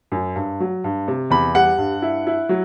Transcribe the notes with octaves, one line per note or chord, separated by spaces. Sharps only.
F#2
G2
F#3
G2
C3
E2 B5
G3 F#5
G2
E4
E4
F#3